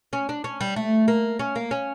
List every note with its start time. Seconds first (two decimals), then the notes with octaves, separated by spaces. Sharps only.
0.13 C#4
0.29 D4
0.44 C#4
0.61 G3
0.76 A3
1.08 A#3
1.39 C#4
1.55 A#3
1.71 C#4